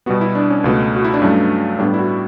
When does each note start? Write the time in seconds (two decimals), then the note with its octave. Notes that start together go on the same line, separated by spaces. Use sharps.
0.06 B2 G3 B3 F#4
0.21 E4
0.35 D4
0.50 C#4
0.64 C#2 B2 A3
0.96 F#4
1.04 E4
1.14 D4
1.22 G2 F#3 A3 C#4
1.79 A2 G3 B3 D4
1.94 E4
1.99 F#4